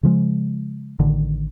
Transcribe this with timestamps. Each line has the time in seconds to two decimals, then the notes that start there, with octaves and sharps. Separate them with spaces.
0.03 C#3 F3 G#3
1.00 A1 D3 D#3